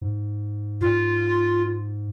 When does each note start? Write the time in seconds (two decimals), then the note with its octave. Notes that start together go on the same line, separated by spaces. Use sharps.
0.01 G#2
0.81 G#2 F4